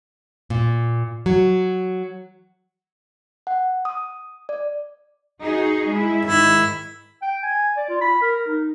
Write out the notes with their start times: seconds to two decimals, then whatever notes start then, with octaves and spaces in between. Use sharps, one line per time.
0.50 A#2
1.26 F#3
3.47 F#5
3.85 D#6
4.49 D5
5.42 D#4 F#4 G#4
5.88 G#3 E4
6.25 G#2 D#3 E4
7.22 G5
7.43 G#5
7.77 D5
7.89 F4
8.01 B5
8.22 A#4
8.47 D#4